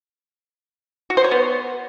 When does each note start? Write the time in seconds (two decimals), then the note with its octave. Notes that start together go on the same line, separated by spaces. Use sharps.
1.10 F#4
1.17 C5
1.24 C#5
1.31 B3